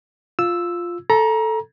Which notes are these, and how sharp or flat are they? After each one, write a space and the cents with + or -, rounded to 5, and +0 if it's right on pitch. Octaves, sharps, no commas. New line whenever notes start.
F4 +0 E6 +0
A4 +0 A#5 +25